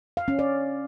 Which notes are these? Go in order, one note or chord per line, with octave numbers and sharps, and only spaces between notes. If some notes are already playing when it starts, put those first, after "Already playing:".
F5
C#4
D5